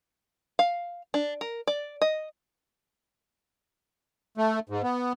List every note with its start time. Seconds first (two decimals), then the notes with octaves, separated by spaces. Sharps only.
0.59 F5
1.14 D4
1.41 A#4
1.67 D5
2.01 D#5
4.38 A3
4.69 G#2
4.83 B3